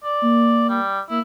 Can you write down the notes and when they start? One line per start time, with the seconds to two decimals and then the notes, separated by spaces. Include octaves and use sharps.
0.04 D5
0.22 A#3
0.69 G3
1.10 A#3 E4